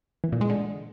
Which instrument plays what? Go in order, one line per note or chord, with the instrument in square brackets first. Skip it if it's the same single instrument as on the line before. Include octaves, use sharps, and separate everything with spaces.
[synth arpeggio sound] E3
A#2
G#3
D3